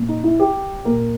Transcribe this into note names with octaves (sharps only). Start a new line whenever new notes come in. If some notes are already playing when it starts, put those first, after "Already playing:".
Already playing: A#2
D#4
E4
G4
A#2 A#4